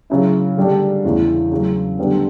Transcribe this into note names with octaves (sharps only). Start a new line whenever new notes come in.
C#3 F#3 C#4 E4
D3 G3 D4
E2 C#3 E3
C#3 F#3 C#4
D3 G3 B3 D4